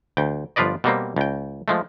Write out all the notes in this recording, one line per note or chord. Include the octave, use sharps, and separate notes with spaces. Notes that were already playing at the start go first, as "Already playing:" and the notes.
D2 G5
G1 F3 F4 B4 D5 D#5
B2 G3 A#3 C4
C#2 G5
F3 G#3 A3